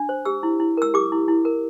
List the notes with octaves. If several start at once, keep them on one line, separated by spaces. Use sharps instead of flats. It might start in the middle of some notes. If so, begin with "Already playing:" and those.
Already playing: D4
C5
G4 E6
E4
E4
A#4 E6
G4 D6
E4
E4
A#4